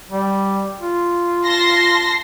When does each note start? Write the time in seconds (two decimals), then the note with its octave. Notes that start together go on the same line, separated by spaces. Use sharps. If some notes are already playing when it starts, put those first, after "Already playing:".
0.12 G3
0.81 F4
1.45 A5 C6 A#6